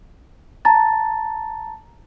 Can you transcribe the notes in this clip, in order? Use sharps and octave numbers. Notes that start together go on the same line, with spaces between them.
A5 A#5 A6